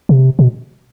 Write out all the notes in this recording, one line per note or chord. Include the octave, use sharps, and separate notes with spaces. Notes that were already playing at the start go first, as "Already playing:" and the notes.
C3
B2